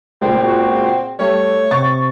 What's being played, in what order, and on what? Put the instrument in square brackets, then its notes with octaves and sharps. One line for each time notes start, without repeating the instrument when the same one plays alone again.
[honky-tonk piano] C#2 A#2 [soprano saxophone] C4
[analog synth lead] F#4
[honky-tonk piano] G3 [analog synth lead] A3 [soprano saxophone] C#5
[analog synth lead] C3 [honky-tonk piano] C#6 A6